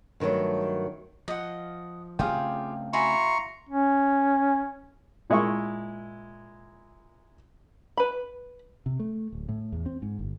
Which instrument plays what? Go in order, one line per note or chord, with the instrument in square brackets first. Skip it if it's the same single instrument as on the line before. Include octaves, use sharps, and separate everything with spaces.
[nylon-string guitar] G2 D#3 F3 F#3 A3
[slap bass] F3 [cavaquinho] D#5 F#5
[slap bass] C#3 A3 C4 [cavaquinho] F4 G4 G#4 [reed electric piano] F5 G5
[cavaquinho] E4 F#4 G#5 [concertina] A#5 C6 C#6
[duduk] C#4
[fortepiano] A#2 G#3 E4 E5 C#6
[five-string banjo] B4 B5
[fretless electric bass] C3
A3
D1
A2
E2
C4
G#2
G1